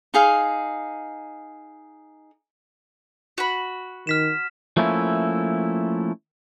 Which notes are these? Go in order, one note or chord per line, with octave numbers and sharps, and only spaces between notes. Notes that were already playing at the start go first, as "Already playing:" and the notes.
D#4 G#4 F5
F#4 B5
D#3 F6 B6 E7
F3 A3 A#3 C#4 E4